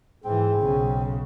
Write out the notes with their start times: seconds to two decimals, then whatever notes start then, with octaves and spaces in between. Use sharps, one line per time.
0.24 G#2 E3 C4 G#4
0.59 B1 C#3